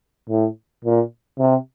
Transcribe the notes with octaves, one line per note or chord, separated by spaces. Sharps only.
A2
A#2
C3